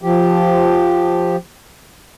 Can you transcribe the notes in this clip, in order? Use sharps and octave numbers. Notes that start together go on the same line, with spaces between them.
F3 G4